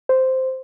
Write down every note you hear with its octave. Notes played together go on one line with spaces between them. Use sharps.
C5